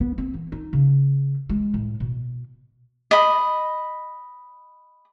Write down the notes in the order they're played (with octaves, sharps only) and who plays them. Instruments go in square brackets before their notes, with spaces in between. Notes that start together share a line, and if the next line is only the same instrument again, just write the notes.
[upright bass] B3
C4
E3
D#4
C#3
G#3
A2
B2
[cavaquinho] D#5 B5